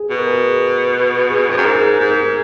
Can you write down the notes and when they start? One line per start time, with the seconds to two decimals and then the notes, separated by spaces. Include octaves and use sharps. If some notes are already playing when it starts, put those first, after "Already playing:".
Already playing: G#4
0.10 B2
0.18 A#4
0.27 G#4
1.30 G#4
1.49 F2
1.57 F#2
1.65 G#2 A#4
1.99 G#2 G#4
2.10 A#4
2.20 G#4